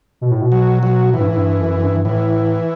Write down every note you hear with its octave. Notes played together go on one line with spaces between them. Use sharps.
B2
A2
B2
F#3
F#3
A2 E3
G2
A2
G2
F#2
F#2
G2
A2 E3